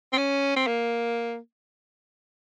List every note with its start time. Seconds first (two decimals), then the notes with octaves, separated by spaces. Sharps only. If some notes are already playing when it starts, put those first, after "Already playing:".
0.13 C4
0.18 C#4
0.57 C4
0.67 A#3